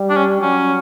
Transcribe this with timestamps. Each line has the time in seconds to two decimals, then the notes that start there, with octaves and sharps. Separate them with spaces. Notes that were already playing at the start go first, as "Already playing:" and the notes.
Already playing: G3
0.10 D4
0.16 C#4
0.42 F#3 C#4